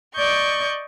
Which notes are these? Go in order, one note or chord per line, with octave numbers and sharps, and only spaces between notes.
D5 D#5 C#6 G6